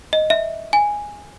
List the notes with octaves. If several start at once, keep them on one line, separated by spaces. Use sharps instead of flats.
D#5
E5
G#5